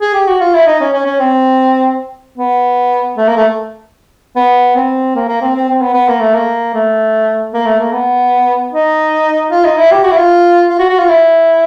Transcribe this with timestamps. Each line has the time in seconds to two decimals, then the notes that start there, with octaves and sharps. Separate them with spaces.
0.01 G#4
0.13 G4
0.27 F#4
0.40 F4
0.54 E4
0.66 D#4
0.80 C#4
0.92 C#4
1.06 C#4
1.19 C4
2.38 B3
3.17 A3
3.28 A#3
3.36 A3
4.36 B3
4.76 C4
5.15 A#3
5.28 A#3
5.41 C4
5.55 C4
5.68 C4
5.81 B3
5.94 B3
6.08 A#3
6.20 A3
6.34 A#3
6.74 A3
7.53 A#3
7.66 A3
7.79 A#3
7.92 B3
8.72 D#4
9.50 F4
9.64 D#4
9.77 E4
9.91 G4
10.04 F#4
10.12 E4
10.17 F4
10.69 F4
10.79 F#4
10.89 F#4
10.99 F4
11.08 E4